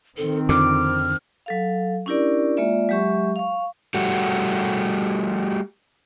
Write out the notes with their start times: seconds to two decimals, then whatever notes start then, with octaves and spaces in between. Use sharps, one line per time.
0.17 D#3 C4 A4
0.49 F2 D3 D6 F6
1.46 F#3 A4 F5
2.06 C#4 D4 E4 G4 A#4 D5
2.57 G#3 A#3 F4 D5 E5
2.89 F#3 G#3 G4 E5 C#6
3.36 F5 C#6
3.94 G3 A3 F#4